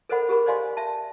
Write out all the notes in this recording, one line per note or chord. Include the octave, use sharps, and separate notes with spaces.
A4 A#4 C5 D#5 F#5 B5
G4 G#4 A#4 B5
C5 D5 D#5 F5 G#5 C6
E5 A5